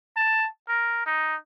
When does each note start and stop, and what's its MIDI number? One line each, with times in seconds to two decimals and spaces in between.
0.16 0.48 81
0.69 1.06 70
1.06 1.35 63